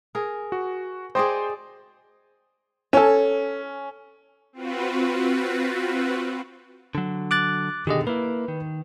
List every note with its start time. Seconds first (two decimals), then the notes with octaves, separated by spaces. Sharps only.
0.15 G#4 A#4
0.52 F#4
1.15 G#4 C5 D5 D#5 G5 C6
2.93 C#4 A4 C#5
4.53 C4 F4 F#4 B4
6.95 D3 F#3
7.31 D6 F#6 A6
7.87 B2 D3 D#3 G4 G#4 D#5
8.07 A#3 E4 B4
8.48 D#3